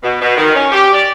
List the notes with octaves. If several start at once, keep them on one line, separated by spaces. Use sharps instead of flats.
B2
B2
D#3
C#4
G4
D5